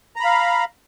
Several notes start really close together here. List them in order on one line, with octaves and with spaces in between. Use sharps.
A#5 B5 F5